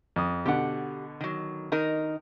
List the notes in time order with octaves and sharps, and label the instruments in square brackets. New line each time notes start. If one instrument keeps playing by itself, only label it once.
[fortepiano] F2 D#6
[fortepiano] B2 D3 [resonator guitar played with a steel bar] G4 F#5
[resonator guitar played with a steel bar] D#3 F#3
D#3 D#4 A#4